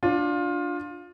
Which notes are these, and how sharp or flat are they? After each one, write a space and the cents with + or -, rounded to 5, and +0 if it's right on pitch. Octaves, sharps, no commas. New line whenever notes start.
D4 +0 F4 +20